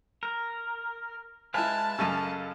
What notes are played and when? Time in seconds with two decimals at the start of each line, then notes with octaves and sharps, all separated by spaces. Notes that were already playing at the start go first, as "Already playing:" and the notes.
0.23 A#4
1.54 G#3 E4 B4 F5 G#5 A5
1.99 F#2 C#3 A4 D#5 F5